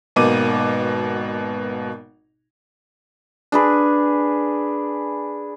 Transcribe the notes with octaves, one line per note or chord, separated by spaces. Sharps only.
G#1 B2 A#3 D6 D#7
D4 G#4 B4